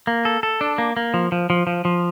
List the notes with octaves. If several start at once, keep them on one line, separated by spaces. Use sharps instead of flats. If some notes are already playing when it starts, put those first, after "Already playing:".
A#3
A4
A4
D4
A#3
A#3
F3
F3
F3
F3
F3